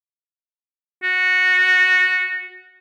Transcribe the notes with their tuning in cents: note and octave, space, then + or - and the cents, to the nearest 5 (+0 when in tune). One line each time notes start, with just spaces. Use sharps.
F#4 -10